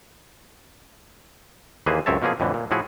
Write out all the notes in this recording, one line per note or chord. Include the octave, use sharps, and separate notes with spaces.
D#2 E3 A#3 G#4 B4 C5
C#2 F#2 C4 C#5 E5 A5
B2 F3 A#3 C#4 G#4
F2 A2 D3 E3
A#2
A2 F3 E4 F#4 G#4